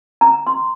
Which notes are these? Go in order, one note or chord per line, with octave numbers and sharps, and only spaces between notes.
A#5
C6